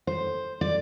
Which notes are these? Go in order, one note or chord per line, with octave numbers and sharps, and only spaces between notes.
C5
D5